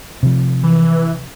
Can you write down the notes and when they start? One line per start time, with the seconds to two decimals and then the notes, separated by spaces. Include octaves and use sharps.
0.23 C3 F3
0.63 E3